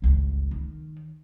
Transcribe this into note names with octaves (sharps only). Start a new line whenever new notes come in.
G1 C#2
D#3